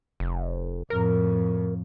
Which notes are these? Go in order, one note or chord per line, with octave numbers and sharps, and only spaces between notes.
F1
F2 A2 A#4